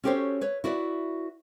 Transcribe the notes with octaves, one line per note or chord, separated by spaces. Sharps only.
C#4 F#4 G4 A4 C5 C#5
B4 C#5
E4 F#4 B4 D5